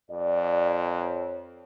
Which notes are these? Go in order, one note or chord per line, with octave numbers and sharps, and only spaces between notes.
F2 D5
C#5